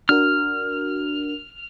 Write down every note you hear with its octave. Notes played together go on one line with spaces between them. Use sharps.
D4 F#4 A#4 F6